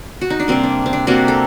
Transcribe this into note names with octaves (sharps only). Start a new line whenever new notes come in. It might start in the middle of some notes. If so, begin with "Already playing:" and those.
F#4
D#4
D4
C3 G3 A#3 C4
D4
C4
D4
C3 G3 A#3 F#4
A4